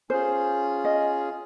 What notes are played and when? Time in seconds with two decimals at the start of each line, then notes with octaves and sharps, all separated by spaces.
0.10 C#4 F4 G#4 C5
0.85 D#5